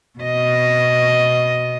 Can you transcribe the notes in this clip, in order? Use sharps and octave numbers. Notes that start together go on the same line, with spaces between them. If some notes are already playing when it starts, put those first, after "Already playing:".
B2 D#5